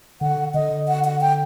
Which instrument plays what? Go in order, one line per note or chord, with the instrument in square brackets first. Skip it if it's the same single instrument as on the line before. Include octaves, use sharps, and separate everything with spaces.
[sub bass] D3 [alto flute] F#5
[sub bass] D3 [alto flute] D#5
[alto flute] F#5
F#5
G5